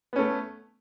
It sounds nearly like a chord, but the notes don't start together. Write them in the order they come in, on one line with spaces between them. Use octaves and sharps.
B3 C#4 A3